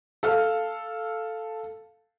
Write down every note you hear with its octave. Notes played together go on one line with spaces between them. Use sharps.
A4 F5 F6